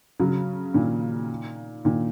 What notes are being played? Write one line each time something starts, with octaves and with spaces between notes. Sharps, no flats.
C#3 F#3
A#2 D#3
A#2 D#3